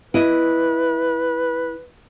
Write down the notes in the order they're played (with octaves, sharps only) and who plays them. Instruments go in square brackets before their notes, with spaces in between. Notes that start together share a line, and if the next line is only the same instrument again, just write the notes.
[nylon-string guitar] E4 D#5 [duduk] B4